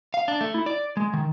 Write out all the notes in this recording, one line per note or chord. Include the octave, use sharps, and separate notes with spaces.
F5
D4
A3
E4
D5
G#3
D#3